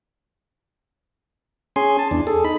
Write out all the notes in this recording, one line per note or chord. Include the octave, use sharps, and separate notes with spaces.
C#4 G#4 G#5 C6
A5
E2 D4
G#4 A4
D#4 B5